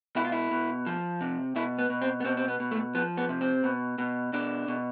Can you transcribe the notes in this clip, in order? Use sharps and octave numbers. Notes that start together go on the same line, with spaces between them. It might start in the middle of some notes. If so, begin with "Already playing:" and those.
B2 E4
F4
E4
B2
F3
C3
B2 E4
B3
B2
C4
B3
B2 C4
C4
B3
B2
A3
F3 B3
B3
C3
C4
B2
B2
B2 D4
B2